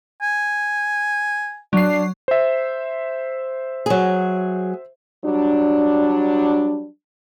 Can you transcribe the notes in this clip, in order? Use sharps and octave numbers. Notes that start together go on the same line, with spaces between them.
G#5
F#3 D4 C7
C5 E5
F#3 G#4
F#3 G3 D4